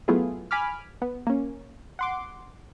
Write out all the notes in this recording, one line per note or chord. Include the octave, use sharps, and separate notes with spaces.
F#3 A3 B3 E4 F4 G#4
G#5 B5 D6 F6
B3
A#3 C#4
F#5 C6 D6